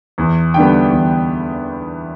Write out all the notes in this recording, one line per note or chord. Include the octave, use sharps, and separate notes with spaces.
E2
D3 G3 B3 G5
E2